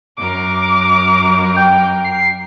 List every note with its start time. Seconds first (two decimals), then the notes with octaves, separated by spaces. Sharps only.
0.17 F#2 A#4 D6
1.57 G5
2.04 C7